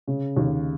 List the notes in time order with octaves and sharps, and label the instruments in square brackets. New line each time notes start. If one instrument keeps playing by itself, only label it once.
[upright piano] C#3
D#2